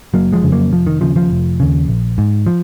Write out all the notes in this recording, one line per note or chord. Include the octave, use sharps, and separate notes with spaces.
F#1 F#3 A#3
F3 G#3
F2 C#3
F#3 A#3
F1 F3
D#3
D#2 C#3 F3
F3
F1
D#2 C#3
A#1
G#2
F3